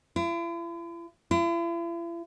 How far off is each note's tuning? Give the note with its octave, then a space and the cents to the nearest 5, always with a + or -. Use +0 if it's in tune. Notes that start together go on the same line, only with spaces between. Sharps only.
E4 +45
E4 +45